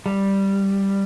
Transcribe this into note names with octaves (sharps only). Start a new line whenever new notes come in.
G3